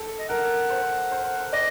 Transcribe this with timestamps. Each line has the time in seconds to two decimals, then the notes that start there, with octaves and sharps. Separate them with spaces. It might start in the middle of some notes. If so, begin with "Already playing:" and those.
Already playing: A4
0.19 D#5
0.29 A#4 F#5
0.70 C5
1.12 C5
1.53 D5 D#5